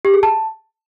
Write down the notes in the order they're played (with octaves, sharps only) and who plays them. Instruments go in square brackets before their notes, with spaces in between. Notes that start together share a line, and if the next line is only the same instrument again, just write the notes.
[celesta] G4
G#4
A5